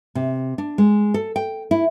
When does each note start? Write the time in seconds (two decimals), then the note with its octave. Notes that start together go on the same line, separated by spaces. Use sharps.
0.15 C3
0.58 D4
0.78 G#3
1.14 A4
1.36 G5
1.71 E4